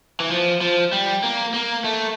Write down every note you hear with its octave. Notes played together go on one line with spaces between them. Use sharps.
E3
F3
F3
G3
A#3
A#3
A3